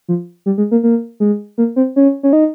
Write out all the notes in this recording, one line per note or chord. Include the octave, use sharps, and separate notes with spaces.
F3
G3
G#3
A#3
A#3
G#3
A#3
C4
C#4
C#4
D#4